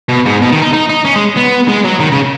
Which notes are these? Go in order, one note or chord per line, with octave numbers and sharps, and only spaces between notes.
B2
G#2
B2
D#3
D#4
D#4
D#4
C#4
G#3
B3
G#3
F#3
D#3
C#3